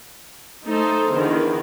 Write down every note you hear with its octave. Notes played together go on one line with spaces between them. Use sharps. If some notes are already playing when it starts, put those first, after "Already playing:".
A3 D#4 A4 C5
E2 D3 D#3